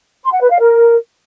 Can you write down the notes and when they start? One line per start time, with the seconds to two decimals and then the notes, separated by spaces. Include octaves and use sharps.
0.23 C6
0.32 F#5
0.41 B4
0.50 F5
0.59 A#4